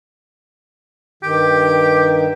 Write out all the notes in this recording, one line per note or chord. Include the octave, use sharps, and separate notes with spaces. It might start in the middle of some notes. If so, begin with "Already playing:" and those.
G2 D#3 G4